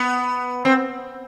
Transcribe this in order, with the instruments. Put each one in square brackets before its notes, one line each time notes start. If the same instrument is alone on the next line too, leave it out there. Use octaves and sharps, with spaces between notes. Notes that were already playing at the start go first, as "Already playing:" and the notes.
Already playing: [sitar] B3
C4